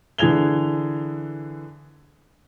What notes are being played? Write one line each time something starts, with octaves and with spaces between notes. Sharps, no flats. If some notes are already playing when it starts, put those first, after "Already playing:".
D3 E3 G#4 G#6 F7 G7